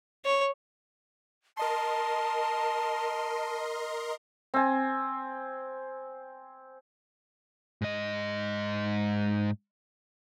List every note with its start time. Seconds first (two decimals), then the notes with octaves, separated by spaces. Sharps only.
0.25 C#5
1.57 A#4 D#5 A5 C6
4.54 C4 G#5
7.82 G#2 D#5